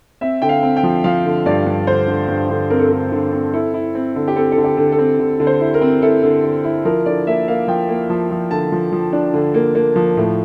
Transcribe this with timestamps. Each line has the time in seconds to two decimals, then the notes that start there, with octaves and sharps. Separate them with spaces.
0.21 C4 E5
0.42 D3 G5
0.49 F5
0.63 C4
0.76 G5
0.83 F3
1.04 F3 F5
1.26 D3
1.46 G2 D5
1.66 G2
1.87 D3 C5
2.08 D3
2.28 G2
2.50 D3
2.70 C4 A#4
2.79 A4
2.88 D3 A#4
3.12 D3
3.32 C4
3.53 E4 A4
3.74 E4
3.95 C4
4.16 D3
4.28 G4
4.36 C4 A4
4.52 A4
4.58 D3
4.64 G4
4.77 D3
4.92 A4
4.98 C4
5.19 D3
5.40 D3
5.47 C5
5.61 E4
5.74 A#4
5.81 C4
6.02 E4 A4
6.23 D3
6.44 D3
6.64 E4
6.85 F3 A#4
7.06 D3 D5
7.27 A#3 E5
7.48 A#3 F5
7.68 F3 G5
7.89 A#3
8.10 F3 A5
8.31 F3
8.51 D3 A5
8.72 F3
8.92 F3
9.13 D4
9.34 D3
9.54 A#3
9.75 A#3
9.96 F3
10.17 A2